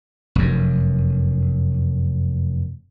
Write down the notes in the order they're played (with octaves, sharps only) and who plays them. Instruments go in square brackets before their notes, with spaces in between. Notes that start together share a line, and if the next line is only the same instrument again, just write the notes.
[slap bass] F1 F#2